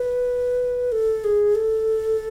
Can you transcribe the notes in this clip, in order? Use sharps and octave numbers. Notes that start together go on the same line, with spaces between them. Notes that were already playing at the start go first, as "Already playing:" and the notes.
Already playing: B4
A4
G#4
A4